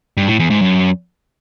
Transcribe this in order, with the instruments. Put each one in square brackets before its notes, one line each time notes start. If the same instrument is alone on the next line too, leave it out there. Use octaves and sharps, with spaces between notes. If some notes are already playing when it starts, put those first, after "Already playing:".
[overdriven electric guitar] G2
A2
E2
G#2
F#2